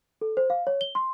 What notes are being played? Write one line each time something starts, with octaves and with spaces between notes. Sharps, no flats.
A4
C5
F5
C#5
G7
C6